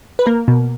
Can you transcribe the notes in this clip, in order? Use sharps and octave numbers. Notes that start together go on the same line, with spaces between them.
B4
A#3 A#4
B2